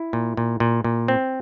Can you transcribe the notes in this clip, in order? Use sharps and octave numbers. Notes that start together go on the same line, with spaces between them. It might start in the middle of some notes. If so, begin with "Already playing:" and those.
Already playing: E4
A#2
A#2
A#2
A#2
C4